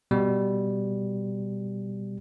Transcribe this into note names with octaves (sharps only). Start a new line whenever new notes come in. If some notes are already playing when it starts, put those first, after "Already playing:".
B2 G3